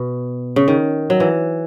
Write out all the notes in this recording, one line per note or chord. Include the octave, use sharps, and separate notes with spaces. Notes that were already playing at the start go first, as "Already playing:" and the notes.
Already playing: B2
C#3
D#3
F#3
E3